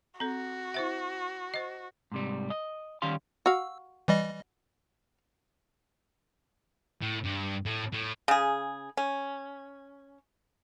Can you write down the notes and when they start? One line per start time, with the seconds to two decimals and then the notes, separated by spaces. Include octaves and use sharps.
0.20 C4 F#4 A4
0.74 E4 C5 E5
1.54 C5 D#5
2.12 G#2 C3 G3
2.50 D#5
3.02 D#3 G3 C#4 G4 F5 C6
3.46 F#4 F5 E6
4.08 E3 G3 D#5
7.02 A2
7.24 G2
7.66 A2
7.93 A2
8.28 C#3 G#4
8.97 C#4